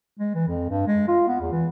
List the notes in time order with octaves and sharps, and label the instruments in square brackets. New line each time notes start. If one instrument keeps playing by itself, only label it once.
[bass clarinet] G#3
E3
F2
G2
G#3
F4
B3
E2
E3